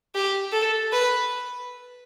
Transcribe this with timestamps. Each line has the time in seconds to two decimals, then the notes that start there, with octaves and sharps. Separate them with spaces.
0.15 G4
0.53 A4
0.92 B4